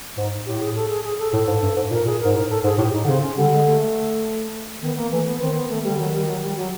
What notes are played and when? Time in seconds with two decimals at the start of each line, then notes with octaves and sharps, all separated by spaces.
0.17 G#2 D#4
0.46 A2 G4
0.61 G#4
0.76 A4
0.90 G#4
1.04 G#4
1.19 A4
1.33 A2 A4
1.47 G#2
1.63 G2
1.76 G#2
1.91 A#2 A#4
2.05 A#2 G#4
2.20 G#2 A#4
2.35 A2 A#4
2.50 A4
2.64 G#2 G#4
2.78 A2 G4
2.93 D#4
3.04 D3
3.07 C#3 C4
3.22 C#4
3.36 D3 G3
3.52 G#3
3.66 A3
4.82 D#3 B3
4.97 A#3
5.11 E3 A3
5.26 B3
5.40 D#3 C4
5.55 B3
5.69 A3
5.84 G3
5.90 D3
5.98 D#3 F#3
6.13 G3
6.27 F#3
6.42 G3
6.57 F#3